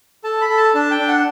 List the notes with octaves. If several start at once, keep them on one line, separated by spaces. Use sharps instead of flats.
A4 A5
B5
A4
A5
D4 A5
G5
D4
F#5